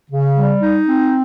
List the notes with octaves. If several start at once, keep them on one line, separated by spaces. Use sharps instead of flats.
C#3
G3
D#4
C4